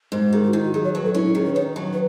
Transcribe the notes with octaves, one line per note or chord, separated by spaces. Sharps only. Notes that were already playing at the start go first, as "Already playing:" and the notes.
G#2
F#4
D#3 G#4
F#4
D#3 E4
F#4
F#3 G#4
C#5
F#3 B4
A4
C#4 E4
E4
D#3 G#4
B4
D#3 C#5
F#3
B4